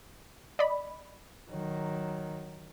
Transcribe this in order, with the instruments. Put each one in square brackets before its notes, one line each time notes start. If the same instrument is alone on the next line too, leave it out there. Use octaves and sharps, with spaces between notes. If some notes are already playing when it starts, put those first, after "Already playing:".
[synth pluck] D5 D#5 B5
[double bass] D#3 F#3